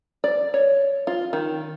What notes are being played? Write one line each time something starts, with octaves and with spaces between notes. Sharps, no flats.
D5
C#5
F4
D#3